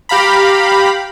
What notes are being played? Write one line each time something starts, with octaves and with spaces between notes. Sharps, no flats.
G4 F5 A#5 B5